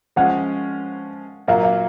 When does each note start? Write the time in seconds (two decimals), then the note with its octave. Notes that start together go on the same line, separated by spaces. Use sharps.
0.16 F3 G#3 C#4 F4 F#5
1.48 A#2 F#3 A#3 F5
1.63 F5